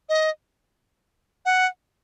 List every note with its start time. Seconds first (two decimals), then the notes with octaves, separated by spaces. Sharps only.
0.09 D#5
1.45 F#5